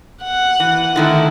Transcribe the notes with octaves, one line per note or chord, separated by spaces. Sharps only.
F#5
E3
D3 D#3 A3 E4